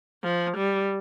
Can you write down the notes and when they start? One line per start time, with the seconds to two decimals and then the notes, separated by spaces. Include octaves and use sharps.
0.24 F3
0.57 G3